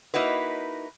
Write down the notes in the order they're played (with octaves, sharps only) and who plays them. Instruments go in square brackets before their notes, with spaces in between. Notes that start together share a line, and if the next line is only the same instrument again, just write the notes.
[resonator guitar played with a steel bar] A#3 D#4 E4 F#4 B4